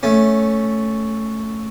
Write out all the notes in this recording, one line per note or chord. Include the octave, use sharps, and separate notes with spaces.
A3 C#4